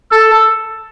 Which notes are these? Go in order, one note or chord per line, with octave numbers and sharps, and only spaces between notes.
A4